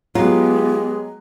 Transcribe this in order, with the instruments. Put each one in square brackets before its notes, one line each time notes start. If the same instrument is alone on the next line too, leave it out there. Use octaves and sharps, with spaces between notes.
[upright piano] F#3 [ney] G#3 [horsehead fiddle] B3 G4 [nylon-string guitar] F4